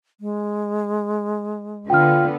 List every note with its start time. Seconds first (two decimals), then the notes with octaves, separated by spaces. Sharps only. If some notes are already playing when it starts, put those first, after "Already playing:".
0.20 G#3
1.90 D3 B3 F4 G5 F6